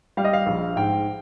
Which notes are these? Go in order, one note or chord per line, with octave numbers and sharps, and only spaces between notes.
G3 F5
D#5
F5
A#1
G#2 G5